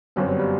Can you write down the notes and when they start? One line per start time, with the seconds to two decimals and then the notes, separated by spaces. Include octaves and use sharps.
0.16 G1 F#2 F#3 B3 C4 F#4
0.29 G3
0.39 G3